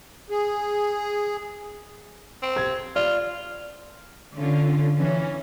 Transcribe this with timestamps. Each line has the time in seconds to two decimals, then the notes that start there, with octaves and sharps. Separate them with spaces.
0.30 G#4
2.43 C4
2.56 G#6
2.96 F4 D5
4.35 D3 C#4 F4
4.95 E3 C#4